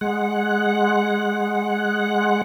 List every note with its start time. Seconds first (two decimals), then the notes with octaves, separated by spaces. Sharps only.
0.01 G#3 F#5